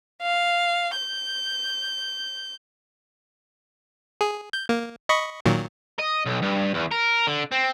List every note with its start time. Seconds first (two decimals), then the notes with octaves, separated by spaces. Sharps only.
0.22 F5
0.96 G6
4.21 G#4
4.53 G6
4.69 A#3
5.09 D#5 B5 C#6
5.45 A#2 D#3 F#3
5.99 D#5
6.26 B1
6.43 G2
6.74 E2
6.91 A#4
7.27 D3
7.52 C4